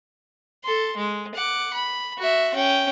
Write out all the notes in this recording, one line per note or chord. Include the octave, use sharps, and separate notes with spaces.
A4 C6
G#3
F#5 D6
B5
F#4 E5
C#4 G5